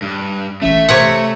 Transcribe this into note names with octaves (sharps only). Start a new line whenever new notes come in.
G2
A#1 E3 A3 C#4 E5
C3 C#5 F#5 E6 G#6